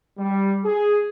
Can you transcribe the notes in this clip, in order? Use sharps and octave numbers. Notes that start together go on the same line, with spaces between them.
G3
G#4